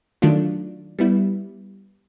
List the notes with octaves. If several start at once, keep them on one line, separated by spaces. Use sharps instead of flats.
D#3 F#3 A3 D4 F4
G3 B3 E4